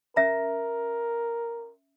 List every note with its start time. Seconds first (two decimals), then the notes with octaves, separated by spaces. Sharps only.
0.16 C#4 A#4 E5 A#5